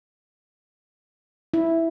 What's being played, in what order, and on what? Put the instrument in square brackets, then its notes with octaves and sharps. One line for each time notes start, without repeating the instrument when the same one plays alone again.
[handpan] E4